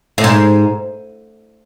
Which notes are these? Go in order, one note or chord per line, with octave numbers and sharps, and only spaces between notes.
A2
G#2